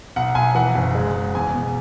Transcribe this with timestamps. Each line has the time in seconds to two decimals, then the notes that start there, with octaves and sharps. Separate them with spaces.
0.16 B1 F#5
0.35 B1 G#5
0.55 E3 F#5
0.75 F#1
0.95 G#3
1.14 G#3
1.35 E2 G#5
1.54 B2